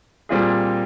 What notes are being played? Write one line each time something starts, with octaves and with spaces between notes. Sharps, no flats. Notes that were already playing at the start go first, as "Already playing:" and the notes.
A#2 G3 C4 F4 G#4